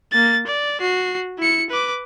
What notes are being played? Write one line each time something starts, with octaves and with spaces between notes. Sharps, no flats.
A#3 A6
D5
F#4 C7
E4 C#7
B4 D6